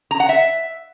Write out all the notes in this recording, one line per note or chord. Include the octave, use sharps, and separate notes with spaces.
A#5
F#5
E5